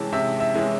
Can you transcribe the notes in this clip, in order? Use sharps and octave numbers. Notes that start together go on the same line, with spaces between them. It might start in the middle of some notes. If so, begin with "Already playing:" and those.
Already playing: C3 E3 G#3 C#4 A5
C3 E5
E5
E3 G#3 C#4